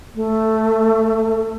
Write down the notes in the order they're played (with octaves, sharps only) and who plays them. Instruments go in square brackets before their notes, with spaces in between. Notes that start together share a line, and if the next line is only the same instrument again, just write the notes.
[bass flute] A3